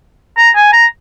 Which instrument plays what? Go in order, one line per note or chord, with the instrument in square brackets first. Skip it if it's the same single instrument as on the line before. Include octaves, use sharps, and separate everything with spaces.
[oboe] A#5
G#5
A#5